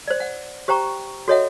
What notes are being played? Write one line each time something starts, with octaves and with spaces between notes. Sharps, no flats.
C5 D5
F#5
G4 C5 G5 A#5 C#6
F#4 A4 C#5 D#5 E5 F#5